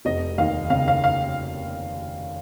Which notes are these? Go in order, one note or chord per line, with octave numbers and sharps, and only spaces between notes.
F1 D#5
D#2 F5
C#3 F5
F5
F5